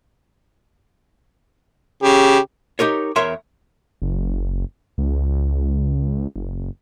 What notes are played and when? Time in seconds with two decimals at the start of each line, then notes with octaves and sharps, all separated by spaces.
2.03 C#3 G4
2.79 D#4 G4 A#4 C#5
3.16 E2 A#4 C#5 E5 A#5 C6
4.02 F#1
4.98 C#2
6.36 F#1